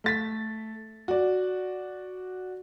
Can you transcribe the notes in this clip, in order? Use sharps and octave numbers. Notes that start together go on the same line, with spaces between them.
A3 A6 B6
F#4 D5